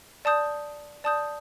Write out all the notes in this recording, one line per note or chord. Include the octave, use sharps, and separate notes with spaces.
D5 A5 D#6 G6
D5 A5 D#6 G6